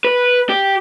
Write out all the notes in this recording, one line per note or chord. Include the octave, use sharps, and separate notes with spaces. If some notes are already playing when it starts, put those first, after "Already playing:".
B4
G4